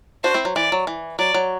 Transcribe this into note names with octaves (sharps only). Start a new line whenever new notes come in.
D4 F#4 C5
C4 E4
F#3
E3 D5
F#3
E3
F#3 D5
F#3